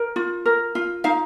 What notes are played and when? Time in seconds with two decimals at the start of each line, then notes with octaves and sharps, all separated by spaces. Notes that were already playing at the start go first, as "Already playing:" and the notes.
Already playing: A#4
0.16 F4
0.46 A#4
0.75 F4
1.04 D#4 F5